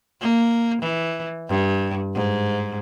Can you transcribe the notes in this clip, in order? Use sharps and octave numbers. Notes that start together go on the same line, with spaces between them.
A#3
E3
G2
G#2